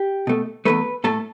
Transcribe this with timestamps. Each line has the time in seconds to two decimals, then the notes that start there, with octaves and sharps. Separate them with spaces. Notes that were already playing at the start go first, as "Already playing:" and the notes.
Already playing: G4
0.27 B2 A3
0.65 E2 B2 A3 B4
1.04 A2 A3 A4